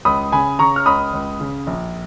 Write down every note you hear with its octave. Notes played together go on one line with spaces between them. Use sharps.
C#2 B5 D#6
C#3 G#5 B5
C#3 A#5 C#6
F6
C#2 B5 D#6
C#2
C#3
A#1